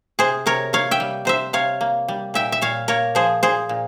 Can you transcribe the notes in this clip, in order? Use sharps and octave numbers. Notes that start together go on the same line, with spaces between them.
C3 G#4 C5
C3 A#4 C#5
A#3 C#5 F5
E5 G5
G3
C3 C5 E5
C3 C#5 F5
A#3
G3
A#2 E5 G5
E5
A#2 C#5 F5
A#3 A#4 C#5
F3 G#4 C5
A#2 G#4 C5
A#2